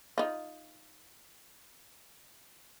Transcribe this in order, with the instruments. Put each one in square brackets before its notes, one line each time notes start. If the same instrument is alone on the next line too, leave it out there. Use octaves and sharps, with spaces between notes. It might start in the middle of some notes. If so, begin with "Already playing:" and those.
[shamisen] D#4 F4